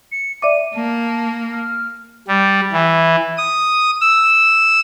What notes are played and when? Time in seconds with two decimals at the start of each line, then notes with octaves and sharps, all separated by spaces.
0.12 C#7
0.42 D5 E5 D6 D#7
0.75 A#3 A5
1.52 F6
2.28 G3
2.73 E3
3.37 D#6
4.01 E6